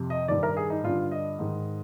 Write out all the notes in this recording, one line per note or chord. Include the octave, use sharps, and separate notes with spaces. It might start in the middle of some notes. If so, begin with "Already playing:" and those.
Already playing: F2 C3
D#5
G2 D#3 D5
A#4
G#4
D#4
G2 D3 F4
D#5
G#2 D#3